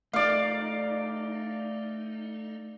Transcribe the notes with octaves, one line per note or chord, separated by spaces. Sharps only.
A3 D#4 D5 F5